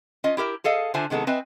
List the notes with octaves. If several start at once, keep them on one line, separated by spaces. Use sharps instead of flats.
C#4 F4 D#5
E4 G4 A#4 E5
G#4 A4 D#5 F5
D3 D4 F4 C5 E5 G#5
C3 D#3 G#3 B3 A4
C4 B4 D#5 E5 G#5